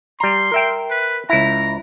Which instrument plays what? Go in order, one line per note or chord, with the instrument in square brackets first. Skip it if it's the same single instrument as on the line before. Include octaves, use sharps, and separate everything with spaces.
[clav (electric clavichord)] G3 A#5 [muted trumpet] C6
[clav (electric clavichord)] A#4 E5 G5
[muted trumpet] B4
[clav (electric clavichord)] C#2 E4 [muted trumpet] A#5